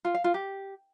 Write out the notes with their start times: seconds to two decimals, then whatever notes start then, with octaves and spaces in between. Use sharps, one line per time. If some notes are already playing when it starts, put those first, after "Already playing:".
0.05 F4
0.14 F5
0.24 F4
0.34 G4